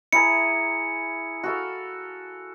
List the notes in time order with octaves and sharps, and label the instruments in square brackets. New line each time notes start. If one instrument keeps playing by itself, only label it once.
[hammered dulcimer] E4 G#4 A#5 [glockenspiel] C#7
[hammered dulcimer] F#4 A4 F5